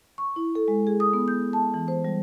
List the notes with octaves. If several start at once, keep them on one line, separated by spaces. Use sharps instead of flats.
C#6
E4
A4
G#3
G#4
D#6
B3
G6
A5
E3
C5
G3